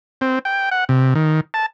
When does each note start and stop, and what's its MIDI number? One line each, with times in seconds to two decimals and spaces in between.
0.21 0.39 60
0.45 0.69 79
0.71 0.84 78
0.89 1.14 48
1.15 1.40 51
1.54 1.66 81